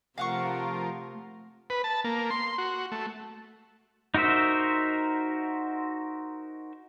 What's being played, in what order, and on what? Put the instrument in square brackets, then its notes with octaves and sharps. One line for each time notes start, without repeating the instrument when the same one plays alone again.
[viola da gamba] C3 A3 [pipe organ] F3 F4 A#4 [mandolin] F5 F#5 C#6
[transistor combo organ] B4
A5
A#3
C6
F#4
A3
[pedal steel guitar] D#4 F#4 A#4 C5 E5